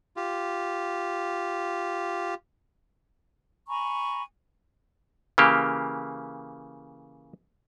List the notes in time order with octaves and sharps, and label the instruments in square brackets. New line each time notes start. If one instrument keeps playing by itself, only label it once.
[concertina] F4 G4
[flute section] G#5 A#5 B5 C#6
[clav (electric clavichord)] C#3 E3 A#3 G4